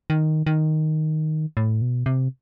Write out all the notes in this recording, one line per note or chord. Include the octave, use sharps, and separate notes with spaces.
D#3
D#3
A2
B2
C3